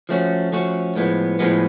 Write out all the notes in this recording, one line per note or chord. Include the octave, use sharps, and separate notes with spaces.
F3 A3 C#4 F#4
F3 A3 C#4 F#4
A2 F3 G#3 B3
A2 F3 G#3 B3